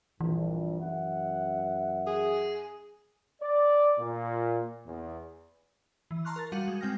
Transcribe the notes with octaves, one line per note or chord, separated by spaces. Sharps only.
A#1 G2 E3
F#2 E5 F#5
G#4
D5
A#2
E2
E3
A5 A#5 C6 C#6 F6 F#6
A#4 A6
G3 F#4 F5 F#5 D#7
G#3
G#3 C4 G5 F6 A#6